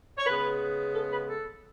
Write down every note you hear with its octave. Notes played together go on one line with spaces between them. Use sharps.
C#5
C#3 G#3 B3 B4
A4
B4
A4